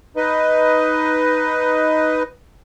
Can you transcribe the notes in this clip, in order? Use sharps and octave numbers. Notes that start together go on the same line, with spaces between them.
D#4 B4 D#5